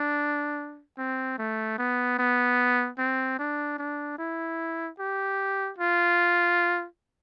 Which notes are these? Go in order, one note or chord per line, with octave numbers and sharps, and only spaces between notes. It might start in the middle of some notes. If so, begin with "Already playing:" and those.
Already playing: D4
C4
A3
B3
B3
C4
D4
D4
E4
G4
F4